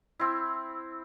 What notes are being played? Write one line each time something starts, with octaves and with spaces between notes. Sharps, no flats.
C4 E4